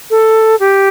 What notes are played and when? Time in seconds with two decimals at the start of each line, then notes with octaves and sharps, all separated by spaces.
0.10 A4
0.60 G4